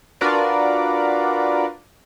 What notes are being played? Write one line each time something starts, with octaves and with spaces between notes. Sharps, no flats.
D4 F4 F#4 A#4 B4 D5